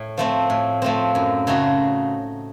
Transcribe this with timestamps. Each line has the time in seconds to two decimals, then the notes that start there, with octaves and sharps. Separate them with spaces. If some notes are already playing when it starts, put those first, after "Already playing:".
Already playing: A2
0.18 F3 A3 C4
0.50 A2
0.82 F3 A3 C4
1.15 F#2
1.47 C#3 A3 D#4 F#4